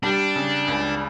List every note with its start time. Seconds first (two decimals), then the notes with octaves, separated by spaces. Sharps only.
0.03 G3 D4
0.36 C#3
0.68 C#2